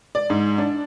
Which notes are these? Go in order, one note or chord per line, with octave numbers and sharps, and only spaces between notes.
D5
G#2
D4